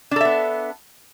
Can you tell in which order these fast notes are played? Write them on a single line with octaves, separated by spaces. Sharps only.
D4 A4 E5 B3